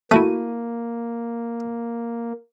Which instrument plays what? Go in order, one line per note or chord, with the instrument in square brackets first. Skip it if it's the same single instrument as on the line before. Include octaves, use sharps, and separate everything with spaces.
[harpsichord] A3 [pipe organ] A#3 [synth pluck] E4 F#4 D#7